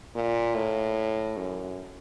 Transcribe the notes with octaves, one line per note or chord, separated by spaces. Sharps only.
A#2
A2
F#2